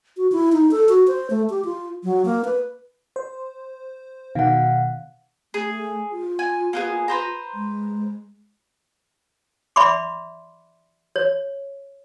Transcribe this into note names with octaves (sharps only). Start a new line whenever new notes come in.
F#4
E4
D#4
A4
F#4
C5
A3
G4
F4
F#3
A#3
B4
C5
B2 D#3 F5 F#5
A3 G#4
F4
G#5
A#3 B3 G#4
B4 C5 A#5
G#3
D5 E5 B5 C6 D6
C#5